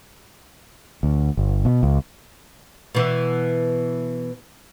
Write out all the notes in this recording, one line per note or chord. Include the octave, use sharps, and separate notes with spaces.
D2
G1
B2
C#2
B2 E3